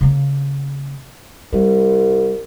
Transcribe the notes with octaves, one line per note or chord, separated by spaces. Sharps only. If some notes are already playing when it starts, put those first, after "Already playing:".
C#3 A#3
C2 G3